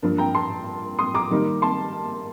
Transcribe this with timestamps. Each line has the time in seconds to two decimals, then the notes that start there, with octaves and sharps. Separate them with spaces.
0.03 G2 F3 A#3 D4
0.18 G5 A#5
0.35 A5 C6
0.99 C6 D#6
1.14 A#5 D6
1.31 D#3 G3 A#3 D#4
1.62 A5 C6